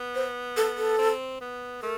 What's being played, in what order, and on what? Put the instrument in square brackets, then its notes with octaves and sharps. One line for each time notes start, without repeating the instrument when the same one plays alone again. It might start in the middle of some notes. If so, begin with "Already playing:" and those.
Already playing: [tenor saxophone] B3
[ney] C5
A4
A4
[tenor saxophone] C4
B3
[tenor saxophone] A3 [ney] A#4